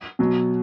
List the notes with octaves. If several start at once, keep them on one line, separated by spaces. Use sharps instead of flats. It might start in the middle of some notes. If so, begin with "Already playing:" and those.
B2 F#3